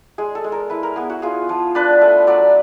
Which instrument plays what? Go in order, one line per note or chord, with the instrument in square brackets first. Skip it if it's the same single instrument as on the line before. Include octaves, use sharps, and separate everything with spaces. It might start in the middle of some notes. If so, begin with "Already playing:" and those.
[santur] G#3 G#4
A4
G#3
A#4
E4 B4
A#4
B3 G#4
F#4
F4 G#4
F3
D4 B4
A3
F#3 D5